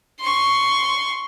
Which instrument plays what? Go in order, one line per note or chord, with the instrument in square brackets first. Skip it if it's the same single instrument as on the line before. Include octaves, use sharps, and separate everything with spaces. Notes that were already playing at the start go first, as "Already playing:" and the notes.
[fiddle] C6 C#6